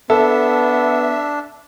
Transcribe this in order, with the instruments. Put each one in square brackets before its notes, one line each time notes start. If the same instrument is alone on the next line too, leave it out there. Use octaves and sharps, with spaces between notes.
[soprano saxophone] B3 [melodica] D4 [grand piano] A4 [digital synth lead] E5